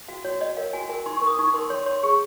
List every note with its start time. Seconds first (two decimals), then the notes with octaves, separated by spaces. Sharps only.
0.08 F#4 F5
0.24 F#4 C#5
0.41 C#5 D#5
0.57 A#4 F5
0.73 F#4 G#5
0.89 A#4 G#5
1.06 D#4 C6
1.16 C#6
1.21 A#4
1.27 D#6
1.38 D#4 C#6
1.54 A#4 C6
1.70 C#5 C6
1.86 C#5 C6
2.03 G#4 C#6